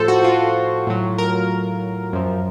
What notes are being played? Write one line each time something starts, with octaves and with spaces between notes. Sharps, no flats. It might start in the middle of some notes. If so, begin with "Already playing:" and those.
Already playing: A2 F3 A4 C5
F#4
F4
A2 F#3
A#4
F#2 F3